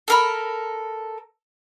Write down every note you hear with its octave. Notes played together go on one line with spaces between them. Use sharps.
A4 A#4 B5